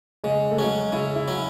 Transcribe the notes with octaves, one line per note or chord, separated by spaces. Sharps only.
C#3 G#3
A3
F#3 G#3 C#4
C#3 E4
E4
F#3 C#4